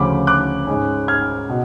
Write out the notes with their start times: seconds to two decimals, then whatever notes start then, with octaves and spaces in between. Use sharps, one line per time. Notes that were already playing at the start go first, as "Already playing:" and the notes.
Already playing: D2 C#3 F3 A3 C#4 B5 D6
0.27 D6 F#6
0.67 G#2 G#3 C#4
1.08 F6 G#6
1.49 B2